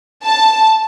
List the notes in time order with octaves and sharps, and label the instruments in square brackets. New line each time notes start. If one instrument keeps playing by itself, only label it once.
[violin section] A5